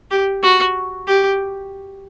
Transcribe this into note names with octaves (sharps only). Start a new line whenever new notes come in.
G4
F#4
G4